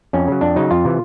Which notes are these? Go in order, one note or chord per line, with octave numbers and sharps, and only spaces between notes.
F2 C#4
C#3 F#3
F2 D4
C#3 F#3 D#4
F2 F4
C3 E3